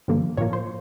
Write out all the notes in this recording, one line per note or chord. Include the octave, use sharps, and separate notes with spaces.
G2 D3 F3 A#3
A2 F3 A#3 C#5
C5